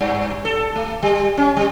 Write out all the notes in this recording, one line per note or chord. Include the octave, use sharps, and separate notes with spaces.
G2
A4
A3
G3
C#4
G3